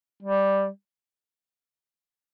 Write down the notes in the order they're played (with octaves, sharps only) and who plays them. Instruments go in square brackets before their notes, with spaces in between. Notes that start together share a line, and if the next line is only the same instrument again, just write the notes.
[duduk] G3